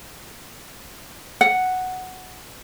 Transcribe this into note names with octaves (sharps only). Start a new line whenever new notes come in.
F#5